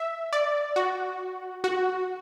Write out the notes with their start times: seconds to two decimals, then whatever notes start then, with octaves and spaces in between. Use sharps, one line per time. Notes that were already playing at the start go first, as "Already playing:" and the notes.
Already playing: E5
0.33 D5
0.76 F#4
1.64 F#4